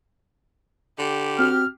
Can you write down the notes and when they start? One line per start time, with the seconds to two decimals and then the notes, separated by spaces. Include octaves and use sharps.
0.99 D3 G4
1.39 C4 F#4 F6